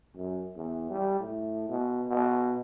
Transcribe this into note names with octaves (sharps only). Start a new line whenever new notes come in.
F#2
E2
G3
A2
B2
B2